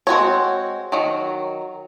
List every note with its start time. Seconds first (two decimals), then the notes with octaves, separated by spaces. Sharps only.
0.07 G#3 C4 F#4 C#5
0.92 D#3 F#3